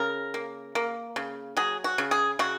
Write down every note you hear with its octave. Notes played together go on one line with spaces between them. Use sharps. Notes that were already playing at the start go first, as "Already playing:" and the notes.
Already playing: C#3 A#4
A#3
A#3
C#3
F#3 G#4
F#4
C#3
G#4
C#3 F#4